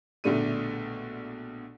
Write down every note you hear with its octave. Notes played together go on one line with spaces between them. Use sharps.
A#1 B2 D3 A3 D4 D#7